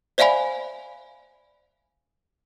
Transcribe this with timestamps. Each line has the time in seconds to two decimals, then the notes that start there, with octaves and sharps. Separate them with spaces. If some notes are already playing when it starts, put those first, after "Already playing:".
0.18 C5 D5 E5 F5 G#5 B5